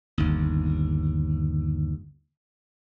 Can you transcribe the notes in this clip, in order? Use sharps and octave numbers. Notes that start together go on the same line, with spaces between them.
G1 D#2